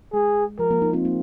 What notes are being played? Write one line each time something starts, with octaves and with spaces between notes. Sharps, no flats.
G#3 G#4
F3 A#4
F3 A#3
A#3 D#4
C4 F4
A#3 D#4